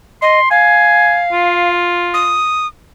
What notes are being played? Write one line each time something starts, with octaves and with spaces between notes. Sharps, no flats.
D#5 C6
F5 G#5
F4
D#6